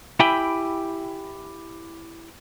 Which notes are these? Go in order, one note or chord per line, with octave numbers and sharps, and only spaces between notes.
E4 G4 E5 G5 G#5 B5